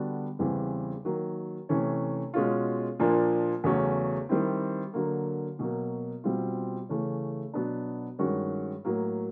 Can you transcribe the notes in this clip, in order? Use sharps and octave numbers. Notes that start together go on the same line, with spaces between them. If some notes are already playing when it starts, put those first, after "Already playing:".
Already playing: D3 G3 B3 D4 F#4
E2 C#3 E3 G3 C4
D#3 F#3 A#3
C3 E3 A3 C#4
B2 G#3 C#4 F4
A#2 F3 A#3 D4 F4
E2 C#3 F#3 A3 C#4
D#3 G3 C4 E4
D3 F#3 A#3
B2 F#3 A#3
B2 G3 C4 F4
C#3 E3 A3 C#4
B2 F#3 B3 D4
G2 D#3 G#3 C#4 F#4
A2 F#3 A#3